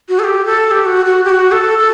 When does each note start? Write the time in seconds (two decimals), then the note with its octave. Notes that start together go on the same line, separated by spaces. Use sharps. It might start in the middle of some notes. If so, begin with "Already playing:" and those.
0.09 F#4
0.19 A4
0.24 G4
0.45 A4
0.66 A4
0.71 G4
0.85 F#4
1.05 F#4
1.25 G4
1.29 F#4
1.52 A4
1.78 A4